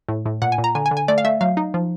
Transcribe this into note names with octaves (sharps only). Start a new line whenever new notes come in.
A2
A2
A#2 F#5
G#5
A#2
A#5
D3 G#5
G#5
D3
G#5
A3 D5
F5
A3 E5
F#3 F5
D#4
F3